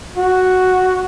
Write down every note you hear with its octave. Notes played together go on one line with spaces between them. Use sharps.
F#4